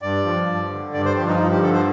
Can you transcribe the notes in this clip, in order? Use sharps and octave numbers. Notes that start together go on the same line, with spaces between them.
G2 D5
F3
G2
D3
G2 D5
C5
F3 G4
D#4
F4
G2 D#4
G4
D3 A4
C5